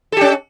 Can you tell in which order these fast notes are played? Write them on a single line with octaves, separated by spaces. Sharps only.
A4 G4 C#4